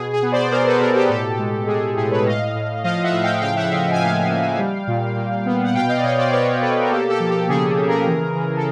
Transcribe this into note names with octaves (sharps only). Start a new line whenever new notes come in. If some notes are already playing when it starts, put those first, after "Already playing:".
Already playing: B2 G#4
G#4
B3
C5 D5
B3 A#4 C5
A4 B4
B2 G#4 A#4
G4 A4
A2 G4 A4
G#3
G#3 G#4
A2 G#4
B4 C#5
A2 D#5 F5
A2
F3 D#5 F5
E5 F#5
A2
F5 G5
C#3 F5 G5
E5 F#5
C#3 D#5 F5
G#5
A#3 F5 G5
A#3
G3
A#2
A#2
B3
F#5
B2 F5 G5
D#5 F5
D5
B2 C#5 D#5
C5 D5
B3 B4 C#5
B2 A4 B4
A#4
A#3 G4 A4
G4 A4
F3
G4
C#3 G#4
C#3
G#4 A#4
E3
E3
A4